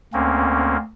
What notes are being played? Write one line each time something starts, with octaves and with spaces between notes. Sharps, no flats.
D2 A#3 C4 C#4